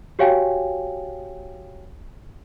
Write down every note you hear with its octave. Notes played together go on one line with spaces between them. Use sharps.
F#4 G4 C#5 F5 G5 G#5